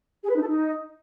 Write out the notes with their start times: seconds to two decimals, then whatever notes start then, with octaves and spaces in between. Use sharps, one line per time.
0.24 G#4
0.30 B4
0.36 D#4
0.42 A4
0.47 D#4